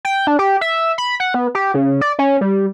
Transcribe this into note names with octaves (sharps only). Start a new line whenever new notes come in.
G5
D4
G4
E5
B5
F#5
B3
G4
C#3
D5
C#4
G3